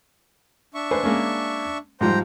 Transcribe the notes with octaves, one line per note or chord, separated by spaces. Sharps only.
D4 E5 C#6
B4 C5 G#5
G#3 A#3 C#4
G#2 F3 G3 C5 G5 A#5